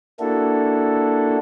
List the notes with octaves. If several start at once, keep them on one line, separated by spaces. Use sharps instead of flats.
A#3 D4 E4 F#4 A4